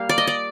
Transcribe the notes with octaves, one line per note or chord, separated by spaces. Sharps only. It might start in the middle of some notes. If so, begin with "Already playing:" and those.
Already playing: G3 A#3 F5
D5
D#5
D5